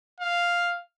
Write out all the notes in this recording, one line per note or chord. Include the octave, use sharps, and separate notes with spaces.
F5